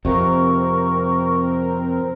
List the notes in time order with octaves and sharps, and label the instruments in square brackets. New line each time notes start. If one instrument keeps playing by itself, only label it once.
[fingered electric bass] F2 C3 [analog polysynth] C4 A#4 [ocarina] C#6